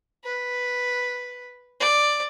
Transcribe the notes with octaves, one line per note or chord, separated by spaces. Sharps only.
B4
D5